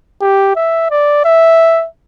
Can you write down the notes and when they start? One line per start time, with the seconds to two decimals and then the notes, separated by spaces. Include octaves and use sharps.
0.21 G4
0.56 E5
0.90 D5
1.25 E5